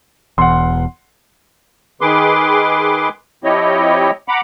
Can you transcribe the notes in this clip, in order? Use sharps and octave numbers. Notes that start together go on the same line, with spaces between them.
E1 E2 F#5 C6
D#3 G#4 B4 C6 D6
F3 C4 E4 G4 C#5 D#5
F#5 A#5 B5 D6